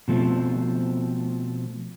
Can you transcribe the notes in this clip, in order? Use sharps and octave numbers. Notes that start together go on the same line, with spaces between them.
B2 F3 A3 C4